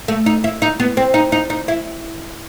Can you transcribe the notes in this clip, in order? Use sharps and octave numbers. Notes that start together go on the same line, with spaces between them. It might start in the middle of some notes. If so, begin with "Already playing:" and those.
A3
D#4
E4
D#4
B3
C4
D#4
D#4
D#4
E4